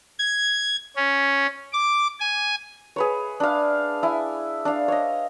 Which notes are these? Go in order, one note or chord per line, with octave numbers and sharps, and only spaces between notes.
G#6
C#4
D6
G#5
G#4 B4 C#5
D4 F5
E4 G#5
D4 F5
C#5 D#5